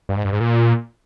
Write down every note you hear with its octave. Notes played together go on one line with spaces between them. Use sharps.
G2
G#2
G2
G#2
A#2